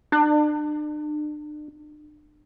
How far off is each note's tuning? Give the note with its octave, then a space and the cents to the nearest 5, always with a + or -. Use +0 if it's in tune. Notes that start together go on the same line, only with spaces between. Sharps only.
D4 +40